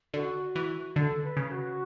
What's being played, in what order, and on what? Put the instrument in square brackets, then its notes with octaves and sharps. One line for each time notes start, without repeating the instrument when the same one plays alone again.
[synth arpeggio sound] D3 [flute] F#4
[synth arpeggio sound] E3
[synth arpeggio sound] D3 [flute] A4
[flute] B4
[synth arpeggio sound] C#3
[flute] F#4